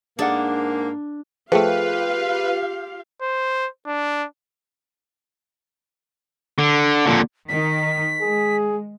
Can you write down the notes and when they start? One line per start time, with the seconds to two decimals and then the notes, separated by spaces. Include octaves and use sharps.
0.19 G#2 A#3 D4 G#4 D5 F#5
1.52 F3 A3 F4 G4 G#4 B4 F5 G5
3.21 C5
3.87 D4
6.59 D3
7.07 A#2 D3
7.49 D#3 D#4 B6
8.21 G#3 G#4